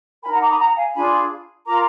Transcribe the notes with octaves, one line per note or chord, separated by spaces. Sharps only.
D#4 A#4 F#5 G#5 A#5 B5
A#5 D6
B5 D#6
F#5 A#5
F5 G#5
D4 F4 G#4 G#5 B5
F4 A#4 A#5 D6